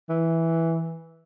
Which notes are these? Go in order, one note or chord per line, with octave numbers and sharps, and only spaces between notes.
E3